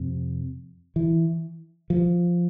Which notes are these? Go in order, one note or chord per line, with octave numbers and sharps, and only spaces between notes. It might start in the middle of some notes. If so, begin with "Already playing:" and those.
Already playing: F2 C3
E3
F3